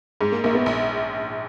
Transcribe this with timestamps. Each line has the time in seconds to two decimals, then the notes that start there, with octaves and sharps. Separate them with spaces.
0.20 G#2 G#3
0.32 A#3
0.44 A#1 A#3
0.55 B3
0.66 A#1